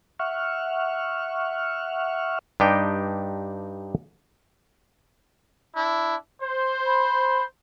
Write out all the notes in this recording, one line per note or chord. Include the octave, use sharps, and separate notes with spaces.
E5 F#5 C#6 F6
G2 D4 D#4 G4 D#5 G5
D4 E4
C5
B5